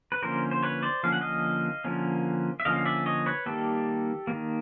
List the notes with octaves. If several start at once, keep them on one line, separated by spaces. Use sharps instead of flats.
B4
D3 F3 A#3 C#4 A#4 C5
C5
B4 C#5
C5 D5
D3 F3 A#3 C#4 F5
F#5
D#5 F5
D3 F3 A#3 C#4
E5
D3 F3 A#3 C#4 D#5 F5
F5
D5 E5
C#5 D#5
B4 C#5
D#3 G3 A#3 G4 A4
D#3 G3 A#3